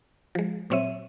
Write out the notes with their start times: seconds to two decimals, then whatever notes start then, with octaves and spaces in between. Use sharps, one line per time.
0.35 F3 G#3
0.70 A#2 F#3 C4 C#5 E5 D#7